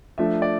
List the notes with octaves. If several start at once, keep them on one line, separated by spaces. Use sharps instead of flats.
F3 A3 D4 E5
D5